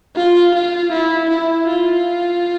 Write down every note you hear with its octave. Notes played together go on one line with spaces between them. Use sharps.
F4
F4
E4
E4
F4